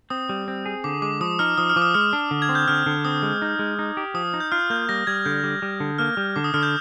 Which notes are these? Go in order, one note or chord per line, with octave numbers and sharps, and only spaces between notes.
C4 D#6
G3
C4
G#4
D3 D6
G#3 D6
F3 D#6
D#4 F6
F3 D#6
F6
F3 D6
D#6
G#3 F6
D4
D3
G#6
C4
G6
D3 F6
D3
C4 D#6
G#3
D#4
G#3
D#4
G4
F3 D#6
D#4
G6
F4 F6
A#3 G6
G3 A#6
G3 G#6
D3 G6
G3
G3
D3
A#3 F6
G3
D3 D6
D#6
D3 F6
G6